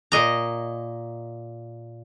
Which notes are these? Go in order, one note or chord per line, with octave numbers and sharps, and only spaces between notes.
A#2 D#5 A#5